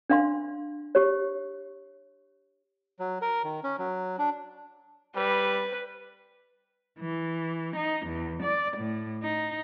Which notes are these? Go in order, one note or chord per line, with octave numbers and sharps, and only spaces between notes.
D4 F5 C6
G4 C#5
F#3
A#4
D#3
C#4
F#3
D4
G3 B4
E3
D#4
E2
D5
A2
D#4